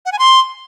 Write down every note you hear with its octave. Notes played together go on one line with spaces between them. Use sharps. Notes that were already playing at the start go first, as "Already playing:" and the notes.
F#5
G#5
C6